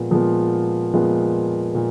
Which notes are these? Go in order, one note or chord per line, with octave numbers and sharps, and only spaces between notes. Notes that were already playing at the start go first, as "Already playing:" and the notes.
Already playing: A#2 F3 G#3 B3
A#2 F3 G#3 B3
A#2 F3 G#3 B3
A#2